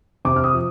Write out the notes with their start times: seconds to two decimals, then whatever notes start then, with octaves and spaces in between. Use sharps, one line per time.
0.25 C3 D6
0.36 F6
0.44 D#6
0.54 F3